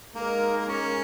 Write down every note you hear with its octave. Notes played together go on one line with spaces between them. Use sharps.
G#3 A#3 D#4 A#4
A#3
C#4